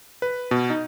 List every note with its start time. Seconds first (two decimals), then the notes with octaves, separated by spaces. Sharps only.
0.22 B4
0.51 B2
0.70 D#4